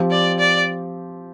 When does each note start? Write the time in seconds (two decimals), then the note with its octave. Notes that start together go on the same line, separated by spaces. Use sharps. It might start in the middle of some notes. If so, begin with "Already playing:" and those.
Already playing: F3 C4 G4
0.11 D5
0.39 D5